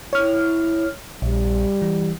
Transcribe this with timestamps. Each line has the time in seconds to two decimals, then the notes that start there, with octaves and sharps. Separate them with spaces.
0.13 E4 C#5 F6
1.22 A#1 G3
1.82 E3